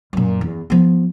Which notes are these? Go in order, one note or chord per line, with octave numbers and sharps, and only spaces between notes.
F#2 A#2
E2
F3 B3